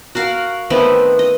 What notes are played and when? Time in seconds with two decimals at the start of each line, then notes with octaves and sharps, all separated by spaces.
0.15 F#4 A#4 F5 F#5
0.70 D#3 A3 B3 C4
1.19 D#5